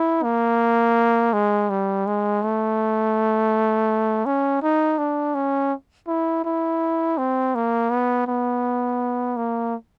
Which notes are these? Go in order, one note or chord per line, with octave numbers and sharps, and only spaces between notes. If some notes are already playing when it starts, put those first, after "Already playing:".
Already playing: E4
A#3
G#3
G3
G#3
A3
C#4
D#4
D4
C#4
E4
E4
C4
A#3
B3
B3
A#3